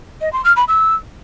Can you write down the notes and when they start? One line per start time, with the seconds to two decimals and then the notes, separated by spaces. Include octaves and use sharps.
0.21 D#5
0.33 C6
0.45 F6
0.56 B5
0.68 E6